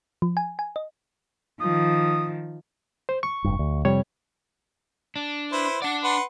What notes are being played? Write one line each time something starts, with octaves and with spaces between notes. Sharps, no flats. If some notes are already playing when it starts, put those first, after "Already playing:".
F3
G#5
G#5
D#5
D#3 F3 D#6
C5
C#6
F1 G2
D2
F2 C3 G3 C#5
D4
E4 B4 C5
D4 D5 F#5
B4 F#5 C6